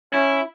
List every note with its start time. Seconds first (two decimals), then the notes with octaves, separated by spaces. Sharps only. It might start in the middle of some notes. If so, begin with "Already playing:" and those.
0.13 C#4 E4